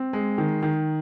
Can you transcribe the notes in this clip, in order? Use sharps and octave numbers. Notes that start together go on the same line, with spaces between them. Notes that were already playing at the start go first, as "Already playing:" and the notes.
Already playing: C4
G#3
D#3
D#3